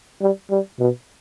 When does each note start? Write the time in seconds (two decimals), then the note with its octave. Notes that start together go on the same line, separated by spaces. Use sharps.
0.21 G3
0.50 G3
0.79 B2